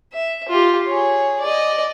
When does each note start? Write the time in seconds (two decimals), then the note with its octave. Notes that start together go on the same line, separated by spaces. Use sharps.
0.13 E5
0.48 F4 G4
0.87 G#4 C#5
1.40 D5 D#5